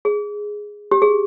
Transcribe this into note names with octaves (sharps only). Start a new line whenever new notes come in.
G#4
G4
G#4